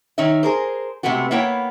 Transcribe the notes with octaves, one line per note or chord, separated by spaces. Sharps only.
D#3 D#4 C#5 E5
G#4 A#4 C5
C3 G#3 A3 B3 F#4
A#3 B3 E4 C#5 G5